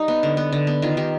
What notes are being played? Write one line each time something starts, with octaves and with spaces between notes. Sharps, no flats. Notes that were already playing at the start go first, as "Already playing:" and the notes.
Already playing: G3 D#4
B3
D3
B3
D3
B3
D#3 F4
D#3 G4